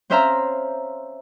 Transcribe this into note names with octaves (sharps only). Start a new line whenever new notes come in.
C4 C#4 C5 E5 F5 A#5